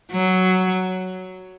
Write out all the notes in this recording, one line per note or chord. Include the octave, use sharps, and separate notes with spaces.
F#3